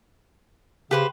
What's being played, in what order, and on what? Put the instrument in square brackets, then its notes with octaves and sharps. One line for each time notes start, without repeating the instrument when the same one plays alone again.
[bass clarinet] C#3 [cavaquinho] G4 B4 C5